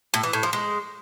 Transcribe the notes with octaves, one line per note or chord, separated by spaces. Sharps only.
A2
E3
A2
F3
G#3